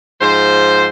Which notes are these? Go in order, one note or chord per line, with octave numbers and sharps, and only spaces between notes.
G#2 F3 C5